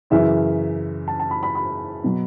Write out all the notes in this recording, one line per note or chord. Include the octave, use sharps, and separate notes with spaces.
F#2 C#3 E3 E5
A5
A5
B5
B5
B5
B2 F#3